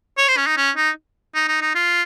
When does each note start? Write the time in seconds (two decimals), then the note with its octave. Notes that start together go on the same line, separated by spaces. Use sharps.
0.18 C#5
0.28 C5
0.37 C#4
0.47 D#4
0.57 C#4
0.76 D#4
1.35 D#4
1.48 D#4
1.61 D#4
1.75 F4